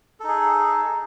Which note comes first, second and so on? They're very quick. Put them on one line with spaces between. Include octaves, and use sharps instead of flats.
A4 D#4 G#4